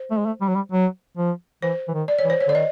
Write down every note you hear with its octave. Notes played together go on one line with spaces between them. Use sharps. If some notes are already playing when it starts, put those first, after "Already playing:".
Already playing: C5
A3
G#3
A3
G3
F#3
G3
F#3
F3
E3 C5
E3
D#3
D5
C#5
E3
C5
C#5
D3 D5
D#3 D#5